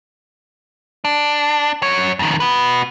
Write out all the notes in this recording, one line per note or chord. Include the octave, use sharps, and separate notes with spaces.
D4
F#2 C#5
F2 D#3
F#4 B4